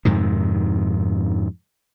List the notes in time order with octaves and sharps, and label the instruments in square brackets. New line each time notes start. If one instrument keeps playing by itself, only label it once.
[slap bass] F2 G#2 C3 D#3